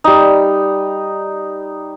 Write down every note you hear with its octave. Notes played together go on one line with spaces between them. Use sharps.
G3 D#4